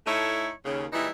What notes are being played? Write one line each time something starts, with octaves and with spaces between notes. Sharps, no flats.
A2 A3 D#4 E4 C#5
D#2 C#3
A#2 E3 G3 G#3 D#4 E4